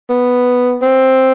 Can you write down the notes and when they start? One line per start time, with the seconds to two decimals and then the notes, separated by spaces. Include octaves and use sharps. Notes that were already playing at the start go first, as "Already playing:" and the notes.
0.10 B3
0.82 C4